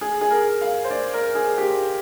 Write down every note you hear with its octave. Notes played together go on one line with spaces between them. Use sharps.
G#4
G#4
A#4
F5
C5
D5
A#4
G#4
G4